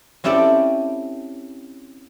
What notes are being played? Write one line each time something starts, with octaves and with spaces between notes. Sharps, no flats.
C4 C#4 E4 G4 A4 D5